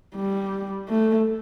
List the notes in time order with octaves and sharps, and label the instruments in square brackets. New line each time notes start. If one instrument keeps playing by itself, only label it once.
[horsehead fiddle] G3
A3